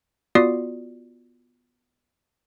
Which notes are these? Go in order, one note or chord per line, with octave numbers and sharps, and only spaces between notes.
B3 F4 F#4 D5 D#6 C7